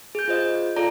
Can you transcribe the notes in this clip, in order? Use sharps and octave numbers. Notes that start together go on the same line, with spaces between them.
G#4 G6
F4 C5 D#5
F4 G#4 A4 D5 A#5